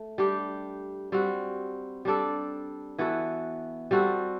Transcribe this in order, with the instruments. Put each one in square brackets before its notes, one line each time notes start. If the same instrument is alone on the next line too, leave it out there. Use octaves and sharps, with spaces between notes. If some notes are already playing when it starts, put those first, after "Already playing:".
Already playing: [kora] A3
G3 D4 G4
G3 C4 F#4
G3 D4 A4
E3 B3 F#4 A4
G3 C4 F#4 A4